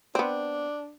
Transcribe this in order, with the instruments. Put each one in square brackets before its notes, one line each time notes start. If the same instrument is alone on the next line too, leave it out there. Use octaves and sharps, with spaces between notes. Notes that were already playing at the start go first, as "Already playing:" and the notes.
[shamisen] B3 C4 [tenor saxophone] D4